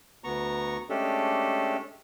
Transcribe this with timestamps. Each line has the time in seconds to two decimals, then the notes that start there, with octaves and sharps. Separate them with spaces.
0.24 D2 B3 A#5 C#6
0.90 G#3 A3 C#4 D4 G4 A4